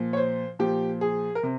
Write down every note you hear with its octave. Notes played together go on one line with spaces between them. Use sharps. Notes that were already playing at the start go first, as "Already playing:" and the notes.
Already playing: A#2 F3
C#5
C5
A#2 F3 G4
G#4
A#4
C3